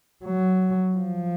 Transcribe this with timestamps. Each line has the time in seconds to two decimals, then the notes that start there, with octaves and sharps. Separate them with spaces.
0.25 F#3
0.97 F3